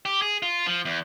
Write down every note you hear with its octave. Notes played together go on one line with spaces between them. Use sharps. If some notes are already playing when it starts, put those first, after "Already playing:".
G4
G#4
F4
F3
E2